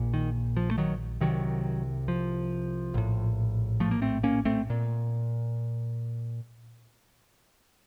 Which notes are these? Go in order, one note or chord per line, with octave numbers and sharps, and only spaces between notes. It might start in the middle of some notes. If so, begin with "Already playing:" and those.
Already playing: A#1 A#2
D#3
F3
A3
D#3 F#3
C2 C3 D#3 F#3
F3
A#1 A2
F3 A3
A#3
A3 C4
A#3 C#4
A3 C4
A#2